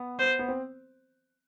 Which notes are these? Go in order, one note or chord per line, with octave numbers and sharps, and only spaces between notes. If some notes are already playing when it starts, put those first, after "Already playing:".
Already playing: B3
C5
B3
C4